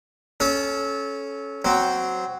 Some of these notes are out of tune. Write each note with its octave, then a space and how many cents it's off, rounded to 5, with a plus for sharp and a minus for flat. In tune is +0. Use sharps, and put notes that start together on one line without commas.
C#4 +0 A4 -25
F#3 +5 C4 -10